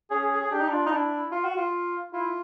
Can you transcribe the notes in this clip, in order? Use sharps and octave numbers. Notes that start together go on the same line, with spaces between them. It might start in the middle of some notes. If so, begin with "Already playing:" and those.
C#4 G#4
G#4
G#4
G#4
D4 G4
D#4
D4 F4
D#4
D4 E4
E4
F4
F#4
F4
E4 F4